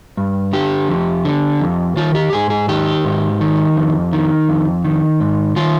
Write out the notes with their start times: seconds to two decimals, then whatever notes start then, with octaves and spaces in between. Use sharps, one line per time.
0.17 G2
0.53 D3 G4
0.88 F2
1.25 D3
1.61 F2
1.96 D#3 F4
2.15 G4
2.32 G#2 G#4
2.50 G#4
2.68 D#3 G4
3.05 G#2
3.41 D#3
3.77 F2
4.13 D#3
4.49 F2
4.84 D#3
5.20 G#2
5.56 D#3 F4